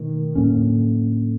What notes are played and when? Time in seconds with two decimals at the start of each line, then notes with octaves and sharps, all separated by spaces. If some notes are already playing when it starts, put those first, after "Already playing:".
Already playing: B2 D#3 A3
0.35 A2 D3 F#3 A#3 C#4